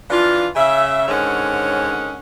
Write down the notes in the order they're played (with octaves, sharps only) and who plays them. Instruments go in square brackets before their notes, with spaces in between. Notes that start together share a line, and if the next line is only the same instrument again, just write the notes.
[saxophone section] E3 F3 D4 F4
C#3 E5
G#2 D3 D#3 C#4 C#5 F#5